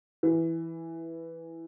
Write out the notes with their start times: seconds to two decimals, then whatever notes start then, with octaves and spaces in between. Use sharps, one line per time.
0.23 E3